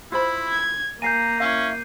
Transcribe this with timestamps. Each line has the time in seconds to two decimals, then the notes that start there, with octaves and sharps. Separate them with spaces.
0.12 E4 F4 C5 B5
0.50 G#6
1.02 A#3 A#4 F5 G#5 A#5 G6 C7 D#7
1.40 C#4 E4 F5